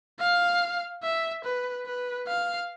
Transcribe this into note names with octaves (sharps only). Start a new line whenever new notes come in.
F5
E5
B4
B4
F5